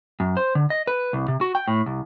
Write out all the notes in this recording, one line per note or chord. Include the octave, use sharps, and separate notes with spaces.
F#2
C5
D3
D#5
B4
C2
C3
F#4
G5
A2
C2